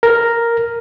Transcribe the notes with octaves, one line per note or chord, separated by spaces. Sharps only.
A#4